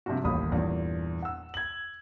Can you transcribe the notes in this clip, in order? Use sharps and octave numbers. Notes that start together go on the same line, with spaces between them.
G2 C3 F3 G3 F4 F#4
D#1 A1 D#2 B5 D#6
E2 G2 A#2
F#5 E6
G#6 F#7